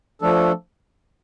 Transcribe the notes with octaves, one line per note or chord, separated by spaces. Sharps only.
F3 A3 D4 A4